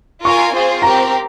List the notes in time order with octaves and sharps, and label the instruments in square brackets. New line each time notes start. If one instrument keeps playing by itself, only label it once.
[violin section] F4 A#4 F5 G#5 [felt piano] C#6
[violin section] C4 F4 G#4 C5
[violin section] C4 G4 A#4 [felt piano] A#5